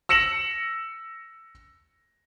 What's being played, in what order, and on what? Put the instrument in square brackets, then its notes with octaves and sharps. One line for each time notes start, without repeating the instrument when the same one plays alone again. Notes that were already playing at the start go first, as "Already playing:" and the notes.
[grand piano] E6 A#6 C#7 E7 F#7